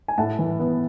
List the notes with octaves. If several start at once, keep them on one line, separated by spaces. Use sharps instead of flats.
G#5
A2 F#5 A5
E3
B3